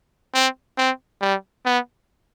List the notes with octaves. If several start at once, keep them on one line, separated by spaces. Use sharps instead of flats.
C4
C4
G3
B3